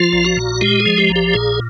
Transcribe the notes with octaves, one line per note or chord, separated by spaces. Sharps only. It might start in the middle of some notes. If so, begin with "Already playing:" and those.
Already playing: F3 F4
A#1
F#4
A#2
G#3 G4
G#4
F3
G4
A#1
G4
A#2 G#4